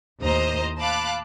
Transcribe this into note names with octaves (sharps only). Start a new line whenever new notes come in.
D#2 A2 C5 D#5 A#5
F5 A5 B5 D6 F#6